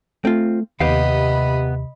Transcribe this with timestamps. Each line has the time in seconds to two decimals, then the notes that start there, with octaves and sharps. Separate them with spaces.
0.25 A3 C4 F4
0.80 D#2 C3 B3 G4 D#5 F5 B5